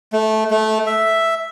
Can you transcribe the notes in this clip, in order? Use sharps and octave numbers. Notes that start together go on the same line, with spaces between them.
A3
A3
E5